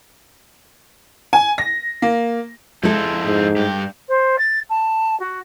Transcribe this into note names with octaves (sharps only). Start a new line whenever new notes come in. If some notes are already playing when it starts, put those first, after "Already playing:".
G#5
A#6
A#3
F2 G#3 E4 A4 C5
G#2
G2 G4
C5
A6
A5
F#4